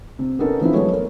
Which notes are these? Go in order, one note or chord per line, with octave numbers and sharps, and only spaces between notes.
C3
B3 C#4 D#4 A4 A#4
E3 F3 B3 C4 D4 E4
F#3 G#3 A3 B3 C#5
A#4